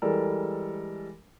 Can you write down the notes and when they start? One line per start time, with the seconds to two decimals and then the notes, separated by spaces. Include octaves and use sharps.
0.02 E3 G3 G#3 A4 A#4